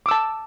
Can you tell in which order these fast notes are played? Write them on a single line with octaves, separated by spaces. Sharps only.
D6 E6 A5